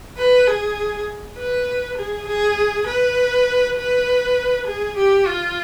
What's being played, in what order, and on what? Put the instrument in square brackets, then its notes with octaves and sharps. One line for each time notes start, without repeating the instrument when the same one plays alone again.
[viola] B4
G#4
B4
G#4
G#4
B4
B4
G#4
G4
F4